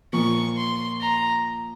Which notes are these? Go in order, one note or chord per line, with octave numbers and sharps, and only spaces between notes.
A#2 F3 A#3 C#6
C6
A#5